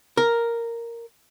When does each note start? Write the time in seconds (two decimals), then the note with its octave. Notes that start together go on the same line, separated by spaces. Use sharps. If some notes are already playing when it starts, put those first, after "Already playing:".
0.17 A#4